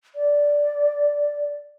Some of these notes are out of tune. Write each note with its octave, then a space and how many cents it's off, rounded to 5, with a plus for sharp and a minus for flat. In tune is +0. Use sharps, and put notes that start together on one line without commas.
D5 -5